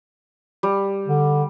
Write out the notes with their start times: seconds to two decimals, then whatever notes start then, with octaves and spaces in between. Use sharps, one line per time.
0.63 G3
1.08 D3